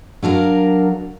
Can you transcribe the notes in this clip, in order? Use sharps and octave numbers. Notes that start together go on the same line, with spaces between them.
F#3 D4 A#4 F5